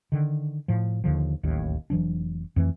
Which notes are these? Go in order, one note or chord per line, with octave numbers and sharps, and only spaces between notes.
D3 D#3
A2 F3
D#2 D3 F3
D1 A1 D#2 A2
F1 E3 F#3 D4
F2 E3 A3